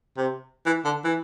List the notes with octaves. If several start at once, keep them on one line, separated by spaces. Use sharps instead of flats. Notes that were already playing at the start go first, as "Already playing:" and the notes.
C3
E3
D3
E3